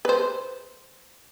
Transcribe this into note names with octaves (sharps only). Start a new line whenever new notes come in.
B4 C5